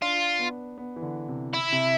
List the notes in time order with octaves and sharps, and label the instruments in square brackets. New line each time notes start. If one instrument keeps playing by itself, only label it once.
[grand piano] D4 [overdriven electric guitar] F4
[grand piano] B3
B3
E3
D3
C3
[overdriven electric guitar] E4
[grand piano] C3